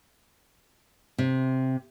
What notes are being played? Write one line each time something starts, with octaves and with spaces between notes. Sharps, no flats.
C3